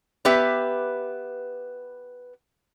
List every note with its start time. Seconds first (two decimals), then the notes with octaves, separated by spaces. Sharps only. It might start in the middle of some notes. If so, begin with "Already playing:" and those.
0.25 B3 G4 B4 E5